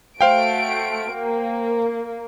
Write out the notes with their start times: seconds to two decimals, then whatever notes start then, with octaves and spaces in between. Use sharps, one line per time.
0.21 A3 F#4 C5 F5 G5 D7
1.12 A#3